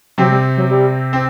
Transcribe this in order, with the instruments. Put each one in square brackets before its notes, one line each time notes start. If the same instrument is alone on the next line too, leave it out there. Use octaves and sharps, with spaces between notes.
[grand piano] C3 C4 [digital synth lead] F#3
[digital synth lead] G3
F#3
G3
[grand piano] C4